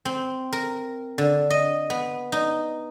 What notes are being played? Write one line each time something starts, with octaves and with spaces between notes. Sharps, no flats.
C4
A#4
D3
D#5
B3
D#4